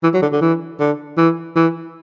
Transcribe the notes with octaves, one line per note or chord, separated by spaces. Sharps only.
E3
F#3
D3
D3
E3
D3
E3
E3